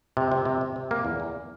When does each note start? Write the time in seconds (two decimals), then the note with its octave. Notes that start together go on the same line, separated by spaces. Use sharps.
0.17 C3
0.32 C3
0.45 C3
0.61 C3
0.76 C3
0.91 A#3
1.05 E2
1.20 E2